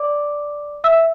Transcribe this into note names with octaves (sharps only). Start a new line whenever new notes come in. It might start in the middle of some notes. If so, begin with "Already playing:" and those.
Already playing: D5 D6
E5 E6